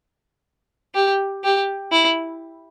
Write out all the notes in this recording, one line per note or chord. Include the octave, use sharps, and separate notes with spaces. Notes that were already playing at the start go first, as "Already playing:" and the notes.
G4
G4
E4